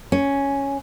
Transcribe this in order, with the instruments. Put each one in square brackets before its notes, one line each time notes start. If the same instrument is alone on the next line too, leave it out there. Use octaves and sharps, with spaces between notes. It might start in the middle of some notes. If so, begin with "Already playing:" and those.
[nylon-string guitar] C#4